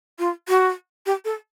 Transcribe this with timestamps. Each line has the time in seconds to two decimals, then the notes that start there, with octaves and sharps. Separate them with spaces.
0.19 F4
0.49 F#4
1.06 G4
1.25 A4